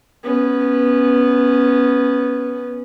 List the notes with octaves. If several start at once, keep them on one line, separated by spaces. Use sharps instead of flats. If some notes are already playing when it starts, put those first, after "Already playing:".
B3 C#4